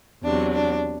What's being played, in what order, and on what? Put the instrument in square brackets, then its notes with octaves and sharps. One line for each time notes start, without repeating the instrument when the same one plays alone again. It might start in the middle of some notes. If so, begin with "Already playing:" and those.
[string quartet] E2 C3 F#3 D4
D4